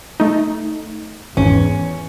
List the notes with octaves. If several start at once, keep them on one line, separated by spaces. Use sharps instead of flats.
A3 D#4
G#1 E2 C#4